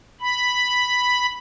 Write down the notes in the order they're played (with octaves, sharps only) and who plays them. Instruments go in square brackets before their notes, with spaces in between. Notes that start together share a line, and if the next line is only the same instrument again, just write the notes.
[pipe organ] B5